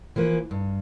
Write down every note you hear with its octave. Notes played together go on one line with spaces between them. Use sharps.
E3 F3 A#3 B4
G2